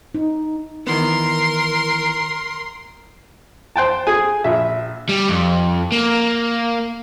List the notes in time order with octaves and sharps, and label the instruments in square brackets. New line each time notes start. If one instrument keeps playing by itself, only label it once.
[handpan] D#4
[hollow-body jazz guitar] D#3 E3 B3 [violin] A#4 C6
[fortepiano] C5 G5 A5
G#4 G#5
A#1 E5
[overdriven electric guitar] G3
F2
A#3